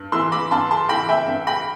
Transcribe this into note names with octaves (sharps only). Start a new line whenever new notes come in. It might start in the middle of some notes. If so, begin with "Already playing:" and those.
Already playing: G2
E3 C6 E6
B5 D6
G2 A5 C6
A5 C6
E3 G5 B5
E5 G5
G2
G5 B5